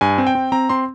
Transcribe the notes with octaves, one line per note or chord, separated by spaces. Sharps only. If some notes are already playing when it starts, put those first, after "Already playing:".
G2 G#5
C4
G5
C4
C4 A#5
C4 C6